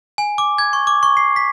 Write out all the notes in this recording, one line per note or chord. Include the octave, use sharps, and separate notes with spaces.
G#5
D6
G#6
C#6
D6
C#6
C7
B6